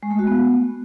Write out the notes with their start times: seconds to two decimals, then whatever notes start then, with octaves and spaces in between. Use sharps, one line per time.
0.03 G#3
0.11 A3
0.19 F#4
0.27 B3